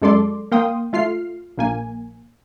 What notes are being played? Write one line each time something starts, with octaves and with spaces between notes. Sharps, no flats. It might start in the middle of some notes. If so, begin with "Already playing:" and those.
F#2 G#3 A4 D5 C6 D6
A#3 F5 G5 C6 D#6
A3 F4 F6 C7
A#1 A#3 G#5